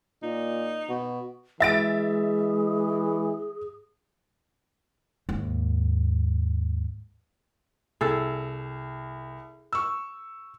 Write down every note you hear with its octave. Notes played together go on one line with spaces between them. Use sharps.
A#2 D#4
B2
E3 G#3 G#4 E5 A6 D7
D#2 G#2
C2 G#4 A4
C#6 E6